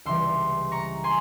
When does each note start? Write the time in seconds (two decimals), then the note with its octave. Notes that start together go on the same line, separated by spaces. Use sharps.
0.05 C#2 C3 E3 G3 C6 E6
0.71 A#5 C#6
1.04 G#5 C6